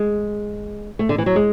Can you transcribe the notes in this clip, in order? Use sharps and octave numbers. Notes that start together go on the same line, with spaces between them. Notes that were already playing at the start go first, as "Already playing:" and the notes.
Already playing: G#3
A3
D3
E3
F#3
G#3